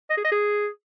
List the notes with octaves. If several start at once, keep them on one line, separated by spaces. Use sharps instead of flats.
D#5
G#4
D#5
G#4